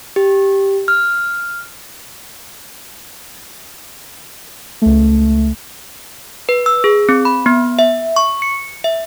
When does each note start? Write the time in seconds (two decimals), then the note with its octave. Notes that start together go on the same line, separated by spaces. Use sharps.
0.16 G4
0.88 F6
4.82 C#2 A3
6.49 B4
6.66 E6
6.84 G#4
7.09 C4
7.25 B5
7.46 B3
7.79 E5
8.16 C#6
8.42 C#7
8.84 E5